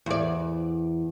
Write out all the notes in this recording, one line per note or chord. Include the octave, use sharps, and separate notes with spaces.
E2 D5